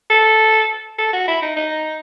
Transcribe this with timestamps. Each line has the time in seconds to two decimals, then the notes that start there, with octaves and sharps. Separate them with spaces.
0.10 A4
0.98 A4
1.13 F#4
1.28 E4
1.42 D#4
1.56 D#4